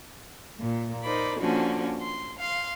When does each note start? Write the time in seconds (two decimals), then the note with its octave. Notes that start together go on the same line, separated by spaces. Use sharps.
0.60 A#2
1.03 D#4 A#4 C5 D5 B5
1.39 D3 F3 A#3 C#4 F#4
2.01 C6
2.39 F5 C6